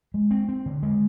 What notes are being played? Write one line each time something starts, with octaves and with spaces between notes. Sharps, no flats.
G#3
C4
C4
D3
G#3